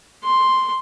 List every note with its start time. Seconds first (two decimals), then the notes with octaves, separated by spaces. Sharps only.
0.25 C6